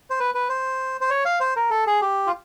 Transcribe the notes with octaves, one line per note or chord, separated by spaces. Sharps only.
C5
B4
B4
C5
C5
C#5
F5
C5
A#4
A4
G#4
G4
F4